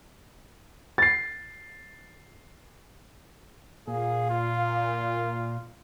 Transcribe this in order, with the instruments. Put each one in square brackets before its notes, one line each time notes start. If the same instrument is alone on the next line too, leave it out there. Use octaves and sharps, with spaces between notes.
[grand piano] A6 C7
[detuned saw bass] A#2 [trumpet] G#4 [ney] F5
[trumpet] F4